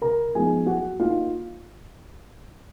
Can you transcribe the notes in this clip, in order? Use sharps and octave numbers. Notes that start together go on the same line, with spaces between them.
C#3 A#4 A#5
F3 G#3 B3 D#4 G#4 G#5
F#3 F#4 F#5
A#3 D#4 F4 F5